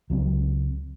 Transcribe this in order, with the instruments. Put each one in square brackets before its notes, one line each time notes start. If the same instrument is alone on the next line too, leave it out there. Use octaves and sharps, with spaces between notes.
[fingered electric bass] C#2 F#3 C4